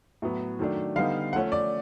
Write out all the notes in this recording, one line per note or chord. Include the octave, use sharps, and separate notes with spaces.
A2 F#3 B3
D#3 F#3 A3 D4
D3 G3 B3 D#4 F5
F3 A3 C#4 F#5
D5